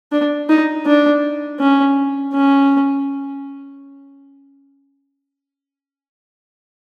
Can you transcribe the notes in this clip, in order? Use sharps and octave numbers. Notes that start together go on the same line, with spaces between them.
D4
D#4
D4
C#4
C#4